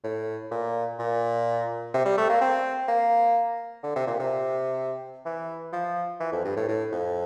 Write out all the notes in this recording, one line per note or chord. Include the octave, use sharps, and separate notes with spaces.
A2
A#2
A#2
C3
G3
A3
A#3
C4
A#3
D3
C3
A#2
C3
E3
F3
E3
F2
G2
A2
A2
F2